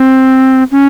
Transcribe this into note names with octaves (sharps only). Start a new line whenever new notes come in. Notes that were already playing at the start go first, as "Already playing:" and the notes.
Already playing: C4
C#4